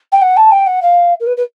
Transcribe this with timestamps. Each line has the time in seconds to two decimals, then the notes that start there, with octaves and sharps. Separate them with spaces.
0.12 G5
0.21 F#5
0.37 A5
0.51 G5
0.66 F#5
0.82 F5
1.20 A#4
1.26 B4
1.37 B4